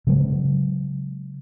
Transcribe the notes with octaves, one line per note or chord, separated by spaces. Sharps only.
C#3 F#3 G#3